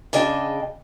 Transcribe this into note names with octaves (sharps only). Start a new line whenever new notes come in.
C#3 D4 G#4 D#5 G5